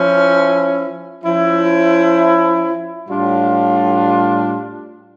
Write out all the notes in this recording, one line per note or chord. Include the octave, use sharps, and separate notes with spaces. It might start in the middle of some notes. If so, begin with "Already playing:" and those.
Already playing: F3 C#4 E4
F3 C#4 E4
A2 G3 D4 F4